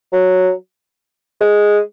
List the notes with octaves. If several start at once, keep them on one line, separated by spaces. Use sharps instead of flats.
F#3
G#3